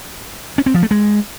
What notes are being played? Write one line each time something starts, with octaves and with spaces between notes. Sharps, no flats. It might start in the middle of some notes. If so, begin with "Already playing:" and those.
C#4
C4
F3
A3
G#3